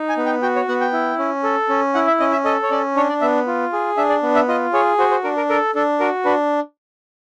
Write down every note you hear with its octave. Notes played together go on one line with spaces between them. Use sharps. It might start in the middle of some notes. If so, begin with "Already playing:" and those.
Already playing: D#4
G#5
B3
G5
F#4 G5
C#5
B3 F#5
G5
E4
C#4
A4
C#4
E4 F#5
E5
C#4 D#5
E5
A4 D#5
C#5
C#4 D5
D4 C#5
D5
B3 E5
F4
G#4
D4 E5
D5
B3
E5
F4 D#5
G#4 C#5
F#4 C5
C5
D4 A#4
A#4
A4 A#4
D4 A4
F#4 A#4
D4 B4